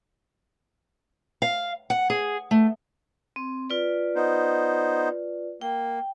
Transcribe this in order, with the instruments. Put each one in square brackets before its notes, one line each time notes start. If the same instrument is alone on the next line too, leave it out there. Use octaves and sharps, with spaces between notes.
[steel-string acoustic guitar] F5
F#5
G#4
A3
[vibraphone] C4
F4 B4 D5
[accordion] B3 D#4 C5
[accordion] A#3 [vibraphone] G5